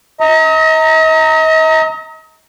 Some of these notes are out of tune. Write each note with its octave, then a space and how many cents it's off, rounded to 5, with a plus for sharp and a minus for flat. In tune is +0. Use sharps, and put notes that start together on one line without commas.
D#5 +40 A#5 -20